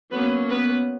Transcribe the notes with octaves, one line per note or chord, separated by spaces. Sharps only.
F#3 A#3 B3 C#4 B4
B3 B4